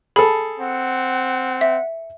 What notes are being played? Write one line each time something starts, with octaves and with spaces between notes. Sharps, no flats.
G#4 A4 B5
C4 F#5
E5